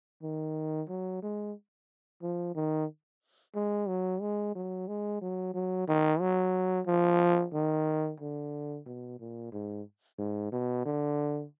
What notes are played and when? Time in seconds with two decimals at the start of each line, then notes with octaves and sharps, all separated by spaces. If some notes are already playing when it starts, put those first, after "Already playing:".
0.23 D#3
0.89 F#3
1.22 G#3
2.22 F3
2.55 D#3
3.55 G#3
3.88 F#3
4.21 G#3
4.55 F#3
4.88 G#3
5.21 F#3
5.54 F#3
5.88 D#3
6.20 F#3
6.86 F3
7.53 D#3
8.20 D3
8.86 B2
9.20 A#2
9.52 G#2
10.18 G#2
10.52 B2
10.85 D3